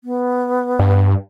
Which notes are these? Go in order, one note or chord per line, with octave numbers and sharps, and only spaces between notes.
B3
G2